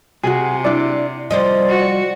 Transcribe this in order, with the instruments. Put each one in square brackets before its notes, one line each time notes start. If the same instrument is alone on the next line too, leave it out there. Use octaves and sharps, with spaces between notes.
[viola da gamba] C3 [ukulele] F#4 G#4
[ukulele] D4 E4 D5
[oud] F3 G3 C4 [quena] D5 [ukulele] D#5
[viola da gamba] F#4